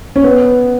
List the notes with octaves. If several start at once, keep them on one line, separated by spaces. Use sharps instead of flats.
C#4
B3